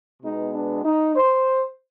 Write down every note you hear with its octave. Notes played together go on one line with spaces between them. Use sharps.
B2 G#3 B3 D#4
D4
D#4
C5